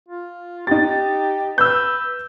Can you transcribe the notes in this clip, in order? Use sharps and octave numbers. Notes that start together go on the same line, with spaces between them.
F4
D#4 G4 A6
B4 E6 G6